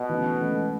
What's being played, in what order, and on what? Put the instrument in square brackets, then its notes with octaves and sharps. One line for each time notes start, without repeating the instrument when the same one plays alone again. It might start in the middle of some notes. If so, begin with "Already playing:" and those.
Already playing: [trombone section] B2
[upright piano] E3 A3 C#4
E3 A3 C#4